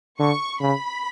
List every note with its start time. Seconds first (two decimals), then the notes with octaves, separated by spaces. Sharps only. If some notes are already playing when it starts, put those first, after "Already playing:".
0.19 D3 C#6
0.60 C#3 B5